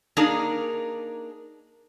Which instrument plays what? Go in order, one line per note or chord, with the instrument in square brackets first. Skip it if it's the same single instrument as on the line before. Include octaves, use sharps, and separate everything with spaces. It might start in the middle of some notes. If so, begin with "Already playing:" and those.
[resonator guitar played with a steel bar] A#3 D4 D#4 G#4 A#4